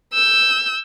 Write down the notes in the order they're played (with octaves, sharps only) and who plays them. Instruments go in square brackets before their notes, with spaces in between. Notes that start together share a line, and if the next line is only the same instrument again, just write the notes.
[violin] E6 G6